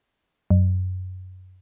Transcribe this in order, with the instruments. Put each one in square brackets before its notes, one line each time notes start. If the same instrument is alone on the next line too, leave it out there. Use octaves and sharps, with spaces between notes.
[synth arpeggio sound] F#2